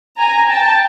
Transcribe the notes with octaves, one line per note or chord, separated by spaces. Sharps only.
G#5 A#5
G5 A5